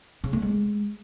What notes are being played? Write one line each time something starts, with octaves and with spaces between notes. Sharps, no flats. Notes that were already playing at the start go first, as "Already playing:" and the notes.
C#3
A3
G#3